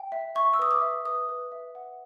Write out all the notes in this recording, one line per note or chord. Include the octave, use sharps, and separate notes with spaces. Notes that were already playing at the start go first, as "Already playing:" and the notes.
Already playing: G5
E5
E5 C#6
E6
B4 D#6
D6
E5
B4 D#6
B4
E5
F#5